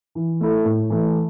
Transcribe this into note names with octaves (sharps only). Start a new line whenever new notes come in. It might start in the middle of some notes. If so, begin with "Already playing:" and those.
E3
A3 E4 A4
A2
E3 A3